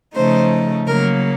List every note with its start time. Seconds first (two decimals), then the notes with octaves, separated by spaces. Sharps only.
0.14 C#3 F3 A3 D#4 C5
0.87 C#3 F#3 A#3 A#4